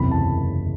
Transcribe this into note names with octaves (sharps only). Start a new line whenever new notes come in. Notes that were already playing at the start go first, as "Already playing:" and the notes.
Already playing: F#1 E2 C3 E3 B5
A5